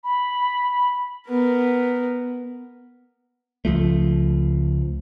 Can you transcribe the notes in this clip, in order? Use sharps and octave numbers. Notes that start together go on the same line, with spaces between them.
B5
B3 A#4
C#2 F3 A3